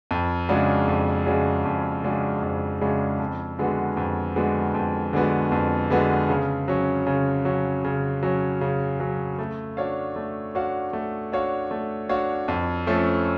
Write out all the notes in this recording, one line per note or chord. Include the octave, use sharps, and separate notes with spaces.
F2
C#3 G#3 D4 F#4
F2
C#3 G#3 D4 F#4
F2
C#3 G#3 D4 F#4
F2
C#3 G#3 D4 F#4
F2
D3 G#3 B3 F#4
F2
D3 G#3 B3 F#4
F2
D3 G#3 B3 F#4
F2
D3 G#3 B3 F#4
C#3
F#3 C#4
C#3
F#3 C#4
C#3
F#3 C#4
C#3
F#3 C#4
A3
D4 F#4 C#5 F5
A3
D4 F#4 C#5 F5
A3
D4 F#4 C#5 F5
A3
D4 F#4 C#5 F5
F2
F3 A3 C#4